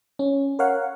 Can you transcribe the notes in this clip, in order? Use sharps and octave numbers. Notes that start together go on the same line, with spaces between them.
C#4
A#4 C#5 F5 F#5